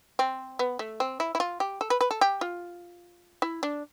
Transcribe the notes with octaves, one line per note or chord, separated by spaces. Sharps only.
C4
B3
A3
C4
E4
E4
F4
G4
A4
B4
B4
A4
G4
F4
E4
D4